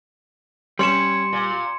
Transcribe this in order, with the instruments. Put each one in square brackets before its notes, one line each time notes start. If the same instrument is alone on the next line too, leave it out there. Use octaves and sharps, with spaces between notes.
[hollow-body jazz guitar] G3 [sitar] C#4 C#5 [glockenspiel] C6 C#7 E7
[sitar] A#2